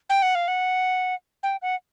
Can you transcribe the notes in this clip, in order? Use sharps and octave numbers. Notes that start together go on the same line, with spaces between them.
G5
F#5
F5
F#5
G5
F#5